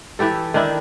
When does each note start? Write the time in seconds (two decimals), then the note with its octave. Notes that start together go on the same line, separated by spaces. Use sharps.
0.19 E3 E4 G4 A4
0.54 D#3 D4 E4